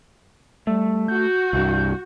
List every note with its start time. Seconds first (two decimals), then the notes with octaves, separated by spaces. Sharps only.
0.67 G3 A3
1.08 F#4 G6
1.53 C2 G2